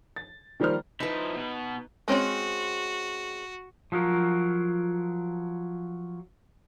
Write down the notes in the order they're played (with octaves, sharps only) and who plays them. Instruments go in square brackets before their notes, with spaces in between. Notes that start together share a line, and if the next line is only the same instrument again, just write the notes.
[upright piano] A6
D#3 F3 G3 A#3 C5 F6
[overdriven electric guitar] F3 E4 [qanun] D#4 B4
[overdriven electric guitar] B2 B3
[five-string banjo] G#3 C4 C#4 [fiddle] F#4
[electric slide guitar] F3 F#3 F4 A#4